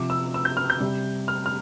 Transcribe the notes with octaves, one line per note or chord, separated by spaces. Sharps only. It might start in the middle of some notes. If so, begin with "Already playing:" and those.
Already playing: C3 F3 D6
E6
E6
G6
F6
G6
C3 G3
F6
F6